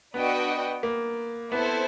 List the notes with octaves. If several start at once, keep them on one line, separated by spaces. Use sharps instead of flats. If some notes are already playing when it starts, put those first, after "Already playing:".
B3 D4 F#4 B4 D#5 G5
A#3
B3 C4 E4 A4 C5